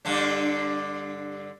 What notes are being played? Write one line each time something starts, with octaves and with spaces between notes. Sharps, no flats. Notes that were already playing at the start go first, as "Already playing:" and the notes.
G2 D3 D4